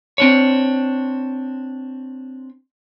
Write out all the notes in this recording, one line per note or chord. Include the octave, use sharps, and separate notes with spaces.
C4 D4 C#5